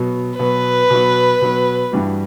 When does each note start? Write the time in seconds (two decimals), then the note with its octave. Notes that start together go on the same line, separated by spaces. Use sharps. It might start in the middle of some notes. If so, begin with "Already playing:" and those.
Already playing: B2 F#3 B3
0.39 B2 F#3 B3 B4
0.90 B2 F#3 B3
1.41 B2 F#3 B3
1.92 G2 E3 G3 D4 F#4